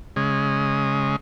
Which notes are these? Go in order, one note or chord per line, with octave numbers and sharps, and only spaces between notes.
C#3 G#3